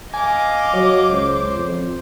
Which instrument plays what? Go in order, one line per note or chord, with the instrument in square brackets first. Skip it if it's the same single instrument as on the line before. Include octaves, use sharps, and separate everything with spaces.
[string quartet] D#5 F5 [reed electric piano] G#5 [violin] D6
[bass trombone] F#3 [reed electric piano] C#5
[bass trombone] C#2 [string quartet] C5
[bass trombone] F2